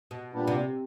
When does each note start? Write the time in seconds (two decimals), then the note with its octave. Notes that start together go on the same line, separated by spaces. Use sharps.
0.11 B2
0.32 A#2 G3 B3 D4 G4
0.47 C3